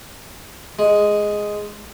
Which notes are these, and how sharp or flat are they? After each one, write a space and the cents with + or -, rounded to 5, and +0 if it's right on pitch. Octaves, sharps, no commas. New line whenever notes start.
G#3 +0